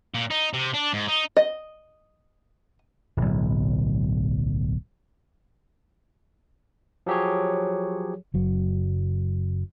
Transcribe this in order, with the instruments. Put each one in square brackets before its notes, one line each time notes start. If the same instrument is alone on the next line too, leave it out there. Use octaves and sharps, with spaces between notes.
[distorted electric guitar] A#2
D#4
C3
D4
G#2
D#4
[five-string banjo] D#5
[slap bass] D1 B1
[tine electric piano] F3 F#3 G4 G#4 C#5
[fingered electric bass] F#1 F#3